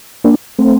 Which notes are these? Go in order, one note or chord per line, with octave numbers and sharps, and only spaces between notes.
A#3 D4
A3 C4